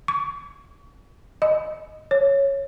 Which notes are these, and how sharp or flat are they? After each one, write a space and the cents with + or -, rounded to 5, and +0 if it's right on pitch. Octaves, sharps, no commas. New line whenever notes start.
C#6 +40
D#5 +0
C#5 -5